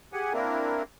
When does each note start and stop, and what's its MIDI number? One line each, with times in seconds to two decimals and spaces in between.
0.13 0.33 67
0.13 0.33 68
0.13 0.33 78
0.13 0.33 80
0.33 0.83 58
0.33 0.83 60
0.33 0.83 62
0.33 0.83 64
0.33 0.83 70